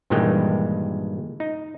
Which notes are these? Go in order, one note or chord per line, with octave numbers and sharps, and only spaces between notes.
G2 A#2 D#3 E3 G#3 G5
D#4